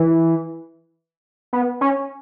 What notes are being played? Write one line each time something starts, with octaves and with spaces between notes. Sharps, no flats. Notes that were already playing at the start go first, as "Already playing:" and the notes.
Already playing: E3
B3
C#4